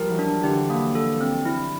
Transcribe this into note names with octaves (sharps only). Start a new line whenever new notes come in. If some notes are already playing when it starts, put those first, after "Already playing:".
Already playing: F3 G3 A#4
E3 F#3
D4
D3 E3 G4
A#3
A4
C4
E4